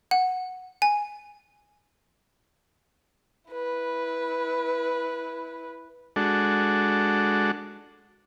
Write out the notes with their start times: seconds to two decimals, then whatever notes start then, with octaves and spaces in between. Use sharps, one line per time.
0.11 F#5
0.82 G#5
3.51 E4 B4
6.16 G#3 D4 F#4 A4